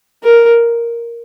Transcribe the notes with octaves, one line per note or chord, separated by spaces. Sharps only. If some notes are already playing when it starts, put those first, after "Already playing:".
A#4